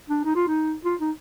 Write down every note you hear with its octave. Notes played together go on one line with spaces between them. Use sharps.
D4
D#4
F4
D#4
F4
D#4